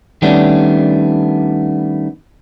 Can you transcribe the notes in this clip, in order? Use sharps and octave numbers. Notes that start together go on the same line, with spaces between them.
D#3 G3 A3 B3 C#4 D4